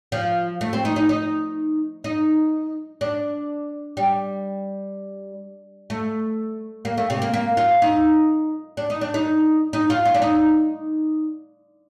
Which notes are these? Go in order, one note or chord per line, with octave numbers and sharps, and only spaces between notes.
F3
A3
C4
D#4
D#4
D#4
D#4
D4
G3
A3
A#3
A3
C3
A#3
A#3
F4
D#4
D4
D#4
D4
D#4
D#4
F4
F4
D4
D#4